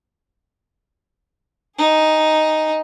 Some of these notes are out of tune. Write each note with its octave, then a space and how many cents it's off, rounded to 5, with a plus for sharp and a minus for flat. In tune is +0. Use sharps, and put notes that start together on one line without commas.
D#4 +0 G#4 +0